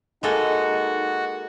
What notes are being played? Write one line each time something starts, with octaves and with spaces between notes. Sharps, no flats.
G#3 A#3 D#4 F#4 A4